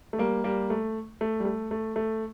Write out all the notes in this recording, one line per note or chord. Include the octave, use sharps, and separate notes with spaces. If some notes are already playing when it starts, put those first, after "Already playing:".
A3
G3 A#3
G3 A#3
A3
A3
G3
A3
A3
A3